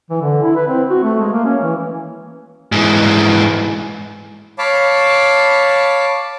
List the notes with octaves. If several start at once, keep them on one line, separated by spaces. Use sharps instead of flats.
E3
D3
E4
B4
C4
F#4
A3
G#3
A#3
C#4
E3
G#2 E3
C#5 F5 A5 B5 D6